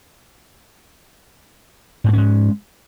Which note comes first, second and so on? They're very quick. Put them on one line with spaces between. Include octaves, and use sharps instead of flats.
G#2 A3 C#4 G#3